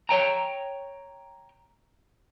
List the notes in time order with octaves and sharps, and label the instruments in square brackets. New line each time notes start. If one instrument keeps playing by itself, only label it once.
[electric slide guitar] C#5 G5 A#5